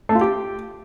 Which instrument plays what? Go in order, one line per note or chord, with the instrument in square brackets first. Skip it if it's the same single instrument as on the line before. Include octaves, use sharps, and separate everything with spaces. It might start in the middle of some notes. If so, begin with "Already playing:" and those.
[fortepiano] A3
F4
G4